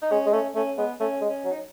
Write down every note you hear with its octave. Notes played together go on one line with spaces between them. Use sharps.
D#4
G#3 C#4
G#3
A3 C#4
A3 C#4
G#3 B3
A3 C#4
G#3
C#4
F#3
D#4